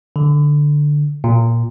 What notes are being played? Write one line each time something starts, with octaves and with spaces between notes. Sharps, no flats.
D3
A#2